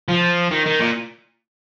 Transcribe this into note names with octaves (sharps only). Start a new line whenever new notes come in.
F3
D#3
D#3
A#2